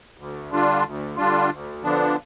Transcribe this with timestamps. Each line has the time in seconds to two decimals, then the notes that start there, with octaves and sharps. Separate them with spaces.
0.18 D2
0.51 D3 G3 D4 F4
0.84 D2
1.17 D3 G3 D4 F4
1.50 D2
1.83 D3 F3 B3 D4